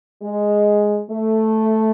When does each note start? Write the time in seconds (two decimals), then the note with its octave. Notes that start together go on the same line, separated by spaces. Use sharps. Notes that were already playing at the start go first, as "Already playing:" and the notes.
0.21 G#3
1.10 A3